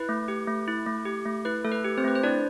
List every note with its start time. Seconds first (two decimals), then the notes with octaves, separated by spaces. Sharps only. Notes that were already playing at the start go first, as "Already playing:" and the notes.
Already playing: E4 B4
0.09 A3
0.28 G4
0.47 A3
0.68 E4
0.87 A3
1.06 G4
1.25 A3
1.45 E4 B4
1.64 A3 A4
1.72 B4
1.84 G4
1.97 C4 C5
2.04 A3 B4
2.15 C5
2.23 D4 E4 D5